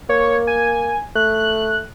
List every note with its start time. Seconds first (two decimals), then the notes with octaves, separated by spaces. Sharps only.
0.09 A#3 C#5
0.47 G#5
1.15 A3 F#6